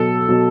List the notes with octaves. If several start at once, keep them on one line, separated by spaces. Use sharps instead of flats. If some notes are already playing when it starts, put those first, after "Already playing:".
Already playing: B2 F#3 A4
B2 F#3